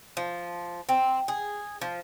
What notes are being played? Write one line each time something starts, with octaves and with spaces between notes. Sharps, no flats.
F3
C4
G#4
F3